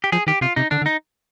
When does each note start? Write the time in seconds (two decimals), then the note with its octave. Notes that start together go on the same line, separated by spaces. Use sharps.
0.04 G4
0.12 F3 G#4
0.27 D#3 G4
0.41 C3 F4
0.56 C3 D#4
0.71 D3 D4
0.82 D3
0.86 D#4